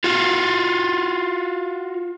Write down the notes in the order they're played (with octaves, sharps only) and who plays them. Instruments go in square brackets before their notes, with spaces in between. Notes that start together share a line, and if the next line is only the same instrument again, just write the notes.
[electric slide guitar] F4 F#4